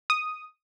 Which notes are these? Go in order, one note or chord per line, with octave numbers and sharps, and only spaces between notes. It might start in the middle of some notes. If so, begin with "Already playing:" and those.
D#6